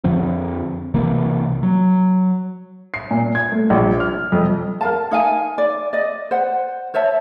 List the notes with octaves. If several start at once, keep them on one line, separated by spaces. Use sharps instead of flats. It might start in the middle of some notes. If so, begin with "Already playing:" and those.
F2 D3 F3 C4
B1 C3 E3 A#3
F#3
C7
A#2
G#6
A3
A#1
F6
F2
A#4 F5 A5
D#4 F5 G#5
D5
D5 D#5
C5 F#5
C5 C#5 E5 A5